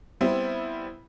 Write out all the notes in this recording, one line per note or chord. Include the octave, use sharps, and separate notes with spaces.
G3 B3 C4 E4